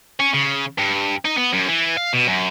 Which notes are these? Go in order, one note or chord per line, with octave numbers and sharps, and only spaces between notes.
C#4
C#3
G2
D#4
B3
F#2
E3
F5
B2
F#2